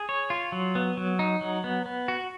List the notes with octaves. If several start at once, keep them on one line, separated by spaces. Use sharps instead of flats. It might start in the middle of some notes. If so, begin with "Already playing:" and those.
Already playing: G#4
C#5
F4
F#3
B3
F#3
D#4
F#3
B3
B3
F#4